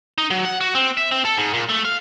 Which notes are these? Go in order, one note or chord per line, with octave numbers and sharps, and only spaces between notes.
D#4
F#3
F#5
F#4
C4
E5
C4
A4
G#2
A#2
A3
F5